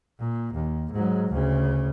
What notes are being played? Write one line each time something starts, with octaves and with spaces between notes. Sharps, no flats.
A#2
D#2
G#2 F#3
D2 C#3